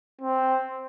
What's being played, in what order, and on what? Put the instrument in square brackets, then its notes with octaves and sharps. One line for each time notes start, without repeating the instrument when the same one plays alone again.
[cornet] C4